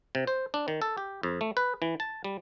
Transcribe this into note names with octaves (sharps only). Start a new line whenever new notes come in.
C3
C5
D4
D#3
A4
G4
F2
A3
B4
E3
A5
G3